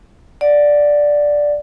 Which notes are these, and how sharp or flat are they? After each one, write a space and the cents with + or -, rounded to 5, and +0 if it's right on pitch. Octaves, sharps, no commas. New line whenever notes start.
D5 +0 F#5 -15